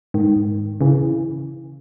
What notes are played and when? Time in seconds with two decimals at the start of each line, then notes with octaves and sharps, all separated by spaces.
0.14 G#2 D#3
0.81 C#3 E3